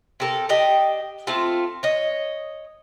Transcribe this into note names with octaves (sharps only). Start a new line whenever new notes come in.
C3 A4 A#4
D4 G4 D#5
A3 C4 F4
C#5 D#5